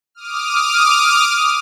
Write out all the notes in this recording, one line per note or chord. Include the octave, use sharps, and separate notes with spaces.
D6 D#6 F6